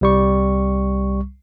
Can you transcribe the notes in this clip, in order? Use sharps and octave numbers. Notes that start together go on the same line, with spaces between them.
C2 G3 C#6